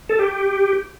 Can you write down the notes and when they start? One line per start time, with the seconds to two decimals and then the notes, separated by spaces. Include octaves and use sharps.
0.09 A4
0.19 G4